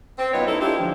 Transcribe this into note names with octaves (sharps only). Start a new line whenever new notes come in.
C4
F#2 B3 D#4 F4 B4 C#5
D#4 E4 A4
G#3 D4 E4 F4 G4
D3 F3